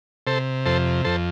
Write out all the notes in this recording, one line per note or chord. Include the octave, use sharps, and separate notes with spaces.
C3 A4 C5
F2 A4 C5
F2 A4 C5